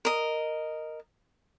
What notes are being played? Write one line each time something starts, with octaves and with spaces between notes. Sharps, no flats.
A#4 D#5